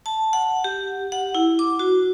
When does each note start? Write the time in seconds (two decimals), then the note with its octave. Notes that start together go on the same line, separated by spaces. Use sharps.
0.06 A5
0.33 F#5
0.64 G4
1.12 F#5
1.35 E4
1.59 D6
1.79 F#4